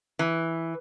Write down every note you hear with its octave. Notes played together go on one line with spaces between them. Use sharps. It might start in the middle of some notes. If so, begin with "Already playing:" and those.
E3